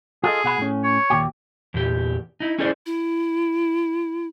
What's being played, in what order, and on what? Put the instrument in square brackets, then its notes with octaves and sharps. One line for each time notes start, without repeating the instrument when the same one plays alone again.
[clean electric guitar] F4 A4 D#5 [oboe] G#4
[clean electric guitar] B2 F#5 B5
A2 C#4
[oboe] C#5
[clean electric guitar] D#2 A#2 G4
[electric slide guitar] E2 A#2 G4
D#4 E4
C#4 E4 G#4 A4 C5 D5
[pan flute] E4